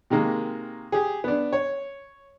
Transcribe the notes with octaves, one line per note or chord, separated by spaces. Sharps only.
C3 D#3 G#3 A#3
G4 G#4
B3 D4
C#5